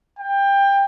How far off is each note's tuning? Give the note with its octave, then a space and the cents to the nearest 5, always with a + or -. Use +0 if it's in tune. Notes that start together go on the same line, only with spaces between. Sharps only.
G5 +20